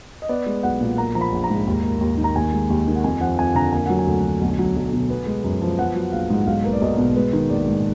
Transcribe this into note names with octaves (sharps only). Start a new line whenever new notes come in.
D#5
B3 D5
G#3
B1 F#5
A#2
A#3 A#5
F3 A#5
B5
A#1
A#5
G#2
D#2
A#3
D#2
D#3
A#5
D#2 G#5
G#3
D#2
D#3
F#5
F2 G#5
F3 F#5
F2 G#5
D3 A#5
A#3 G#5
F#3 F#5
G#5
D2
D3
B1
F#3
B1
B2
B3
G#3
F#2
F3
B3 F#5
F#3
A#1 F5
G#2
B1 F5
A#3 B4
D5
B1 D#5
B2
G#3 B4
D#3
A#1 D5
G#2